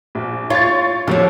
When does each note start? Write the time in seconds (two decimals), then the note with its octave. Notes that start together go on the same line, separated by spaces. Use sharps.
0.15 A#1
0.50 F4 C#5 A6
1.08 D#2 D3 F3 C#4